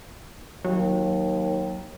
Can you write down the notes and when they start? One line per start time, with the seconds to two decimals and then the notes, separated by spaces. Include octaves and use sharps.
0.65 D#2 F#3